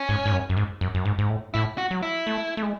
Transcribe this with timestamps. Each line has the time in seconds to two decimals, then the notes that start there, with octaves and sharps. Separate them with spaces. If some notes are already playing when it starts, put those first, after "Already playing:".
Already playing: C#4
0.09 G#2
0.26 G#2
0.32 F#2
0.49 F#2
0.57 G#2
0.81 F#2
0.94 F#2
1.05 G#2
1.18 G#2
1.29 A2
1.54 A2 E4
1.78 F#4
1.91 F#3
2.03 E4
2.27 A3
2.57 A3
2.62 G#3